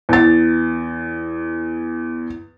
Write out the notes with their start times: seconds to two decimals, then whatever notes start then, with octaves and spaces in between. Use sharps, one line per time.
0.09 E2 A6